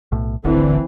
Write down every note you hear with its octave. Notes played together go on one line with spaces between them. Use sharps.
B1 A2
D1 G#1 D2 D3 E3 C4